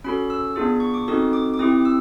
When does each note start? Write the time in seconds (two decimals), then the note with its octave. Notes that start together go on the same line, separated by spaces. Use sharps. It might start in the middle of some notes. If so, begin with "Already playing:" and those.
0.04 C#4 F#4 A4 B5
0.30 E6
0.56 B3 D4 F4 G#4
0.80 C#6
0.94 D6
1.08 C4 D#4 F#4 A4 D#6
1.33 D6
1.54 D6
1.59 C4 E4 G4 D#6
1.85 E6